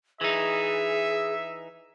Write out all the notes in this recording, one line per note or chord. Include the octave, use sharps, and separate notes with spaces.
E3 D#4 G#4 E5